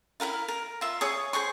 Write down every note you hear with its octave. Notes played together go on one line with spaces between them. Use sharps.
E4 F#4 A#4 F5
A#4
F4 E5
G#4 C#5 D#6
G#4 C5 G#5 C#6